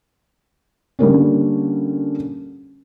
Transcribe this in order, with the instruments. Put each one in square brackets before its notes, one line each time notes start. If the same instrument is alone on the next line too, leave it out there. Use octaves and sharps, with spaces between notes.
[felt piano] D3 G3 A#3 C#4